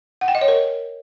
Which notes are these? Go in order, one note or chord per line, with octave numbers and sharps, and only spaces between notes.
F#5
G5
D#5
C#5
A#4